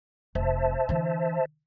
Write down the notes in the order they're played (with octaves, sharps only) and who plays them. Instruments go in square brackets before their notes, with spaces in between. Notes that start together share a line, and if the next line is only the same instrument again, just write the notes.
[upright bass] F1 [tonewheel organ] C5 E5 A5
[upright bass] D3 E3